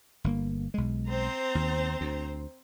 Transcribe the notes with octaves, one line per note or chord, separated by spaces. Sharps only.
G1 C3 A#3
B1 G#3
C4 C5 A#5
D#2
D2